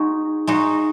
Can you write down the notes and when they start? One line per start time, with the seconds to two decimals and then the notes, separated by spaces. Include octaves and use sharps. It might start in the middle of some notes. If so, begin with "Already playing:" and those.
Already playing: G#3 D#4 F#4
0.47 G#3 D#4 F#4